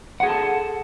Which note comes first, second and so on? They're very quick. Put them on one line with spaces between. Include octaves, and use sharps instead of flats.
F#5 G#4 A4 A5